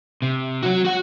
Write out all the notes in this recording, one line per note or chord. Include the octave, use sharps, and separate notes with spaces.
C3
F#3 F#4
F#4 F#5